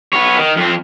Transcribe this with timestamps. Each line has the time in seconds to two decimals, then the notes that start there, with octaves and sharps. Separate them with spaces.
0.13 B3 C#5
0.38 D#3
0.57 F2 C4